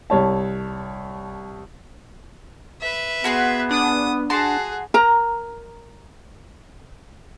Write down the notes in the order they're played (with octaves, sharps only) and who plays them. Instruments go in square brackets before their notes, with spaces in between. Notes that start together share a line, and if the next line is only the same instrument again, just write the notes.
[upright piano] C2 C#5 A5
[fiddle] B4 E5
[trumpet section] B3 [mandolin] F#4 G#4 C6
[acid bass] D4 [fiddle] D#6
[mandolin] F#4 A5 C6 [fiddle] G#4
[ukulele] A#4 A#5